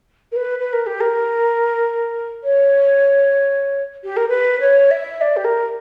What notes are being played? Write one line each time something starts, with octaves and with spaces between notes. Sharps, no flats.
A#4
B4
B4
A#4
G4
A#4
C#5
G4
A#4
B4
C#5
E5
D5
G4
A#4